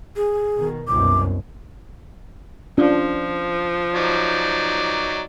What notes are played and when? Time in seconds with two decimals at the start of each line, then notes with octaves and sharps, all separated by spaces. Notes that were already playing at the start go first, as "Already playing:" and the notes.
0.16 G#4
0.58 B2 D#3
0.88 C2 F#2 B2 D6
2.78 F3 C#4 D4 F4
3.95 F#3 D#4 D5